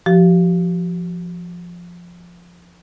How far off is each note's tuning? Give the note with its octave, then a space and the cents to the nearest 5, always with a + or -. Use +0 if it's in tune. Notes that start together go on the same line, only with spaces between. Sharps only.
F3 +0 G4 -40